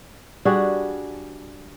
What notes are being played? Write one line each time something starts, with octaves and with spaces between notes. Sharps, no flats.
G3 D4 F#4 G#4